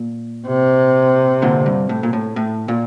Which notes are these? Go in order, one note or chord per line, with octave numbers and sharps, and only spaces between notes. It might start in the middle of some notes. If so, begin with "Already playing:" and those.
Already playing: A#2
C3
A#2 D3
G2
A2
A#2
A2
A2
A#2